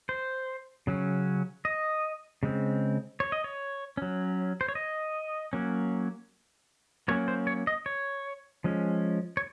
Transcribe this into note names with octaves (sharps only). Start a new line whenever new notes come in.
C5
C#3 F#3 C#4
D#5
C#3 G#3 C4
C#5
D#5
C#5
F#3 C#4
C5
C#5
D#5
F#3 A#3 C#4
F#3 A#3 C#4 C#5
C5
C#5
D#5
C#5
F3 G#3 C#4
C#5